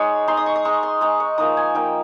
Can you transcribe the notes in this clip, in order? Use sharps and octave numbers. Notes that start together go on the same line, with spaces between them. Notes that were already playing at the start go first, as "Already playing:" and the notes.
Already playing: G#3 D#4 C#5
G#3 D#4 C6
D#6
C#6
D#6
G#3 D#4 C#6
C6
G#3 D#4 C#6
C#6
F3 A#3 D#4 D#6
G#5
F3 A#3 D#4 G5